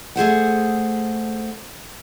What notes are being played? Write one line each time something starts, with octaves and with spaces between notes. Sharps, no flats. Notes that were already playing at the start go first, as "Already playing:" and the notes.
A3 G#4 C5 F#5